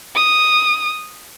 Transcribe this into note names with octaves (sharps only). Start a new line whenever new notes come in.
D#6